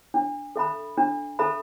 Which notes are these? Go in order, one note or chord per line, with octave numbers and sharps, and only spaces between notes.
D4
A4 E5 B5
D4
A4 E5 B5